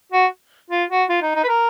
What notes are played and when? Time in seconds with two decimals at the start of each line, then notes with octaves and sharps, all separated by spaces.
0.12 F#4
0.70 F4
0.90 F#4
1.09 F4
1.22 D#4
1.35 D#4
1.44 B4
1.48 A#4